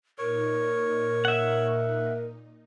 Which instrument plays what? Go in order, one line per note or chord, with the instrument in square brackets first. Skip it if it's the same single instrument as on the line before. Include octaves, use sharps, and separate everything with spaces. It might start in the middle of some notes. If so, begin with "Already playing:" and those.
[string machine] A#2 D#4 [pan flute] A#4 [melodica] C#5
[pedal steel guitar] E5 F#5